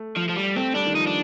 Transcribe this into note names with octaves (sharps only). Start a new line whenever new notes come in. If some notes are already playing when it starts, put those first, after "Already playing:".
Already playing: A3
F3
F3
G3
A3 C4
G3 D4
D#3
F3 D#4
D4